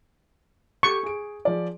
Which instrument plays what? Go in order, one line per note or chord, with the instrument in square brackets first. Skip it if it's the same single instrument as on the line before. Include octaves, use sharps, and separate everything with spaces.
[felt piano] G4 A4 [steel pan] C#6
[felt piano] G#4 D7
F3 G#4 D5